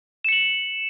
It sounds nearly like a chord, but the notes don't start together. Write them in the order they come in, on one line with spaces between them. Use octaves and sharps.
E7 C#7 F#7